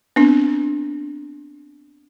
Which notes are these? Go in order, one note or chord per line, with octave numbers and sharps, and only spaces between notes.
B3 C4 D4